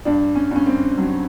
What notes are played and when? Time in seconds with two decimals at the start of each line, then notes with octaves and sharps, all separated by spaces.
0.05 G2 D4
0.35 C#4
0.51 G2 C#4
0.66 C4
0.98 F#3